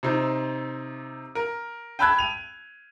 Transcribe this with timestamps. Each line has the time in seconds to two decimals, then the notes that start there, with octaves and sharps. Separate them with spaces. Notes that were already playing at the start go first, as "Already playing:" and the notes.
0.03 C3 C4 D#4
1.35 A#4
1.99 G5 A5 B5 E6 F#6 G#6
2.18 D#7 F7